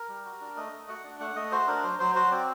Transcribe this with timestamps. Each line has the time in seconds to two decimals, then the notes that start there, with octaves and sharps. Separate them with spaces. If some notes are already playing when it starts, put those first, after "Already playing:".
Already playing: A#4
0.09 G3
0.25 F#4
0.41 D4
0.56 A3 D#5
0.73 A3
0.88 F#4 F#5
1.04 D4
1.20 A3 F#5
1.36 A3 D#5
1.52 F#4 C5
1.67 D4 A#4
1.84 F#3 C5
1.99 F#3 C5
2.15 F#4 C5
2.31 C4 D5